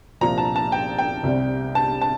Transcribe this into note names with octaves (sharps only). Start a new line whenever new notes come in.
C2 A#2 F3 A#5
A5
A5
G5
G5
C2 C3 G3
A5
A5